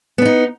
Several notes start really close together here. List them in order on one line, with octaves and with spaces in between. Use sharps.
B3 D4 D#4